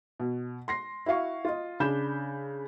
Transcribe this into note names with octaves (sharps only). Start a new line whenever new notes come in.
B2
C6 A#6 C7
E4 F#4 F5 C#6
F4 D#5
C#3 D4 B5 G6 E7